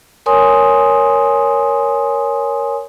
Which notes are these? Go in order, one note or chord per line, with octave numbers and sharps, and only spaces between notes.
A#4 C#5 G#5 C6 D#6